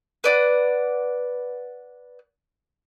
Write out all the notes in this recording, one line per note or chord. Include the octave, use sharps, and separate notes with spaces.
B4 D5 F#5